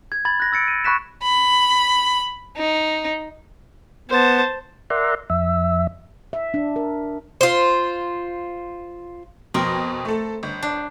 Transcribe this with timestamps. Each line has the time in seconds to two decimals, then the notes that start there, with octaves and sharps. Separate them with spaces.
0.12 G#6
0.25 B5 G#6 A6 F#7
0.40 F#6 A#6
0.52 E6 A6 C#7 D7
0.68 D#7
0.84 B5 C#6 F#6 B6 E7
1.23 B5
2.57 D#4
4.10 B3 C5 A5
4.90 A#4 D5 E5 F#5 A#5 C6
5.30 F2 E5
6.33 E5
6.54 D4
6.76 A#4
7.41 F4 C5
9.54 F2 B2 C4 A#4
10.05 A3 A4
10.43 G1
10.63 D4